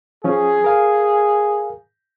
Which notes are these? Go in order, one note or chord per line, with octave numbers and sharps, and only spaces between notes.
F3 C#4 G#4
A#4 F5 G#5